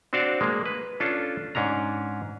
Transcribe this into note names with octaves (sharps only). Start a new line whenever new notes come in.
C4 D4 F#4 C5 D5 F5
G#3 A#3
B4
C#4 D4 F4 A4
G#2 C#4 D4 A#5